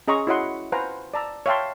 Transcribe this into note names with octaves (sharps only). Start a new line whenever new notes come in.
C#4 G#4 D#5 A#5 C6 C#6
E4 F#4 C#5 D#5 F#5 C6
B4 C5 F5 F#5 G#5 A#5
D5 A5 A#5 E6
C#5 E5 F5 G5 A5 C6